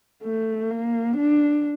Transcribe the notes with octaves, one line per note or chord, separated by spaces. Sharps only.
A3
A#3
D4